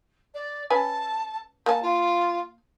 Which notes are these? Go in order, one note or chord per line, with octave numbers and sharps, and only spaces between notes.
D5
C#4 B4 G#5 A5
A#3 G#5 A5
F4